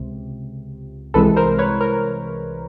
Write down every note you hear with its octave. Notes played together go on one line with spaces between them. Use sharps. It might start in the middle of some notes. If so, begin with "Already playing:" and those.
Already playing: C#2 C3
C2 C3 E3 G#3 A4 B4
A#4 C5
B4 C#5
A#4